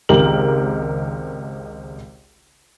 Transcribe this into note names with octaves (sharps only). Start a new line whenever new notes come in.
G#1 C#2 G#3 G4 A#4 F#7